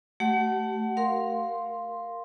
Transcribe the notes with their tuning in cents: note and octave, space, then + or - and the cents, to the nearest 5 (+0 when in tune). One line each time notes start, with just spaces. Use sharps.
A3 +0 G4 -35 F#5 +15
A#4 +0 F5 +0 C6 +0